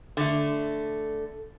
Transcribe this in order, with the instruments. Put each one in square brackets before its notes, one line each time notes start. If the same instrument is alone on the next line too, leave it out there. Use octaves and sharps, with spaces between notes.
[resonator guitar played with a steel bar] D3 A3